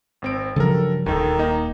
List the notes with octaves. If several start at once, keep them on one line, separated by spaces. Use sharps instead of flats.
G#1 C4 D7
G2 C#3 F3 F#3 A4 A#4
D#1 D2 D#3 D#4 A4
A#3 D#4 D#5